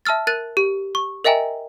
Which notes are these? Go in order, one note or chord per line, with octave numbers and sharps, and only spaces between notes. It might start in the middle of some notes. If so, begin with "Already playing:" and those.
E5 A5 E6 F6 A6
A#4 F#6 A6 D#7
G4
C#6
A#4 D#5 E5 G5 G#5 A#5